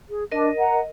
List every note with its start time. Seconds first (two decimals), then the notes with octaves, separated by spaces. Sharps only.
0.09 G#4
0.32 D4 A#4 D#5
0.59 F#5 A#5